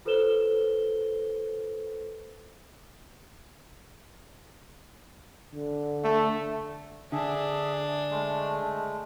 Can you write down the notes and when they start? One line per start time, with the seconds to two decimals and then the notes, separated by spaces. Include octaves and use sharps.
0.05 F4 A4 B4 C5 E7 G7
5.54 D3
6.04 A3
7.12 D3 D4 G#4 E5
8.11 G#3 A3